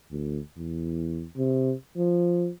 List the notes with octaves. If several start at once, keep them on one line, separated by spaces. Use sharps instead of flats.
D2
E2
C3
F3